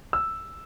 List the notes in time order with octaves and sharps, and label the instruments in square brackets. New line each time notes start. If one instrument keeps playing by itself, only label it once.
[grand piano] E6